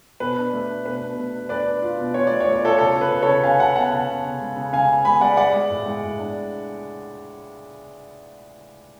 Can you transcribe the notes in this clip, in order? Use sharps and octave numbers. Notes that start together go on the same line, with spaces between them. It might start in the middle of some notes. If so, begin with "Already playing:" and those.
B2 B4
D4
A3
D4
B2 B4
B2
A3
D4
D4 B4 D5
D4
F4
B2
F4 C#5
A3 D5
C#5
A3
D5
F4 A4 C#5
C#3 A4 C#5
C#3
B4
C#3
A4 C#5
C#3
C#3 F5 G#5
C#3 F#5 A5
B3 F#5 A5
C#3 F#5 A5
B3
C#3
G#3
C#3
C#3 F5 G#5
C#3
G#3 G#5 B5
G#3 D5 F#5
G#3 D5 F#5
G#3
A2
G#3
A2
D4